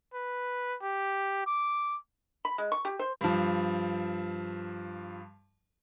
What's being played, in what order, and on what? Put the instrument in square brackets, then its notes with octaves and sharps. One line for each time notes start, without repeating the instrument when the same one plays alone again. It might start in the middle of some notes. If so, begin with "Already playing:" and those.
[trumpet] B4
G4
D6
[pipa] B5
G#3
C#6
G4
C5
[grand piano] G2 F3